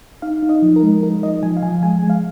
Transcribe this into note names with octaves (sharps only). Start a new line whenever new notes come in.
D#4 F5
D#4
D#5
F3
A#4
G#3
D#4 A#4
F3 D#5
F3 G#5
F5
F3 G#5
G#3 G#5
G#3
F5